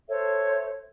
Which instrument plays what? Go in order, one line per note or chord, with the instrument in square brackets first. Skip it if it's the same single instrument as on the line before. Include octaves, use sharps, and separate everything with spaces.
[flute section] A4 C5 C#5 E5